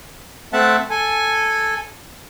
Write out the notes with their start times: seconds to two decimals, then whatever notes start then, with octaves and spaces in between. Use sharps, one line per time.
0.53 A3 C4 E5 F#5 A5
0.90 A4 G#5